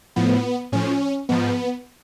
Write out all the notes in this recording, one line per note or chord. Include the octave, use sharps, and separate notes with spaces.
A2 F3 B3
A2 F3 C#4
G#2 F3 B3